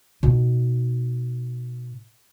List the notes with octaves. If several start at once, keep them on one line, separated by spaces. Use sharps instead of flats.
B2 D#4